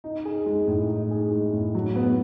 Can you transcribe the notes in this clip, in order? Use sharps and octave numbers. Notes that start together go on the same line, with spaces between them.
D#4
G#4
G#3
A2
D#4
G#4
G#3
A2
F#3
B3